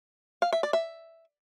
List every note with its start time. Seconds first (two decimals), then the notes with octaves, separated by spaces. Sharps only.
0.42 F5
0.53 E5
0.63 D5
0.73 E5